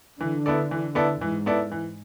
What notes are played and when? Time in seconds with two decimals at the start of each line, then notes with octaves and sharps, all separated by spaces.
0.20 D3 E3
0.46 B3 E4 A4 D5
0.71 E3
0.95 B3 E4 A4 D5
1.20 G#2 E3
1.46 B3 E4 A4 D5
1.72 E3